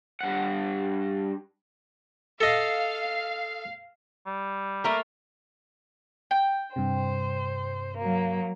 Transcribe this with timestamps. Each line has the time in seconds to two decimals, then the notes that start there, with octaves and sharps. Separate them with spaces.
0.21 G2 F#5
2.41 A4 D#5 F5
4.26 G3
4.84 A3 A#3 A#4
6.31 G5
6.76 G2 C3 C5
7.98 F#3 A#3